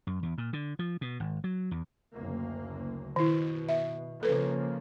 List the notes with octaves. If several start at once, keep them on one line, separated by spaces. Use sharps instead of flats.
F#2
E2
A#2
D3
F3
B2
G#1
F#3
E2
F#1 D2 A#3
B2 D#3 E4
E5
C#3 F3 A#3 A4 B4